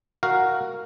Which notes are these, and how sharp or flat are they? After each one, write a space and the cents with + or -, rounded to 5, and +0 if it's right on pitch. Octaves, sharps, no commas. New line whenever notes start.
F#4 +0 A#4 +0 F5 +0